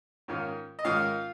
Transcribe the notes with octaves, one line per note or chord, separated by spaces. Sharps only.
G#2 D#3 C#4 F4
D#5
G#2 D#3 G#3 C#4 F4 F5